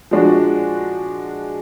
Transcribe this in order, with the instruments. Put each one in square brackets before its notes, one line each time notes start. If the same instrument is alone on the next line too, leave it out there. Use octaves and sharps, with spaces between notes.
[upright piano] F3 G#3 D4 F#4